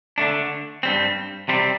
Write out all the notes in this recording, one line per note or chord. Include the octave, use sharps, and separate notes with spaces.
D3 A3 D4
G2 G3 C4
C3 G3 C4